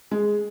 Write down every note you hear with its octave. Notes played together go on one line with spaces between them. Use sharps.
G#3